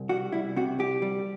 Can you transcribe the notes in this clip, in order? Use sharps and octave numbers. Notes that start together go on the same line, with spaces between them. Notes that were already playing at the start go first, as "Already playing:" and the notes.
Already playing: C2
G3 F#4
C2 E4
C3 F#4
C2 G4
G3